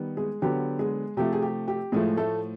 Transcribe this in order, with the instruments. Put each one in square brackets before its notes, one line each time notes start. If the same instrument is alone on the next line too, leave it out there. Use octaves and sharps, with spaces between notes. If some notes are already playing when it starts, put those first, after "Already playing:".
Already playing: [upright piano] D#3 G3 B3
G#3 G#4
D3 F#3 B3 G4
G#3 G#4
C3 F3 A3 G4
G#4
G4
G4
A2 F3 G#3 A3 G#4
A3 A4